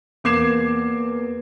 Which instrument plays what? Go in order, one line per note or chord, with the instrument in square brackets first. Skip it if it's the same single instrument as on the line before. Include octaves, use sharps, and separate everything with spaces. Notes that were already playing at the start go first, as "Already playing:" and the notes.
[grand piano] E2 A#3 D6 G#6 C7 E7